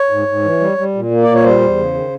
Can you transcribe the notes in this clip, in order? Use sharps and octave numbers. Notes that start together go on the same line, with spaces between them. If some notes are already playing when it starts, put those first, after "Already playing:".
Already playing: C#5
G#2
G#2
E3
G3
G3
A#2
A#3
A#2 D5
C#5
G3 C5
E2
C#3
D#3